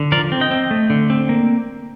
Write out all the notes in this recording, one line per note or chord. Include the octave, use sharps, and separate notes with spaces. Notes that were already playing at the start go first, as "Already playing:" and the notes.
Already playing: D3
F3 A#4 D5
C4
D#5 G5
C4
A3
D3
C4
A#3